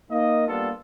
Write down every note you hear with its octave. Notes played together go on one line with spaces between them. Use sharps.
A#3 D#4 D#5
G3 A#3 B3 D4 F4 A4